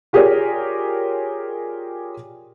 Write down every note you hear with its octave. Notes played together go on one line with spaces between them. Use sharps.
F4 G4 G#4 A#4 C#5 D5